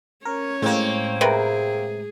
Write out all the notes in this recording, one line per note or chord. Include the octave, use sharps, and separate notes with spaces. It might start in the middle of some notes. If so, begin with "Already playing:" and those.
C#4 A#4 C#5
A2 G#3 A#3 C4
C3 G#4 A#4 B4